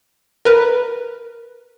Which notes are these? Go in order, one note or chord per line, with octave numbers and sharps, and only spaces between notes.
A#4 B4